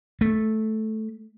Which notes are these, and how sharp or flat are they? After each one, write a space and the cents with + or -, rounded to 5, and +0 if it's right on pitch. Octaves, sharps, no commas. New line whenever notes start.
A3 -10